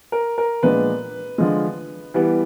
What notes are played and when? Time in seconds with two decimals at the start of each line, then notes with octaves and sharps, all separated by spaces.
0.12 A#4
0.38 A#4
0.63 A#2 F3 G#3 B3 D4 B4
1.38 D3 F3 G#3
2.14 E3 G3 B3